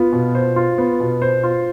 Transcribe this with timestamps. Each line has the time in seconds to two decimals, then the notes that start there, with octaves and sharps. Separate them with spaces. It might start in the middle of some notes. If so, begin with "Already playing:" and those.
Already playing: B3 F4
0.12 B2
0.35 C5
0.56 F4
0.78 B3
1.00 B2
1.22 C5
1.43 F4